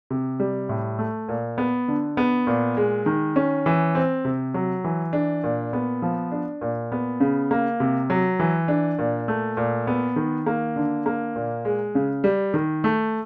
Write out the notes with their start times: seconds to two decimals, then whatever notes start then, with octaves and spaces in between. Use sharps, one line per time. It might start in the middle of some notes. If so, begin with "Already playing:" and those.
0.10 C3
0.40 G3
0.69 A2
0.99 A3
1.29 A#2
1.58 B3
1.88 D3
2.17 B3
2.47 A#2
2.77 G#3
3.06 D#3
3.36 C#4
3.66 E3
3.95 C4
4.25 C3
4.54 F#3
4.84 E3
5.13 D4
5.44 A#2
5.73 B3
6.02 F3
6.31 D4
6.61 A#2
6.92 B3
7.20 C#3
7.51 A#3
7.80 C3
8.10 F#3
8.39 E3
8.68 D4
8.99 A#2
9.28 A3
9.57 A#2
9.87 B3
10.16 D#3
10.46 A#3
10.76 D3
11.06 A#3
11.36 A#2
11.65 G#3
11.95 C#3
12.24 G3
12.54 D#3
12.84 A3